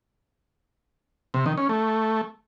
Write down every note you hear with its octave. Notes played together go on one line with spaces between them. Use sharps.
C3
D#3
C#4
A3